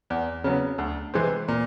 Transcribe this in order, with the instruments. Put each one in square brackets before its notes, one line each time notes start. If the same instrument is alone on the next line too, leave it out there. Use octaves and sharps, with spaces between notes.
[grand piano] E2
C#3 F#3 B3
D2
C3 E3 G#3 C4
A#2